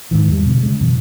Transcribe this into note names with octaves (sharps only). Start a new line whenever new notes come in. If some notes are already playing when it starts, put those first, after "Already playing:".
G#2 D#3 E3
E2 G3
B2 D3
C#3 G#3
F#2 B2 E3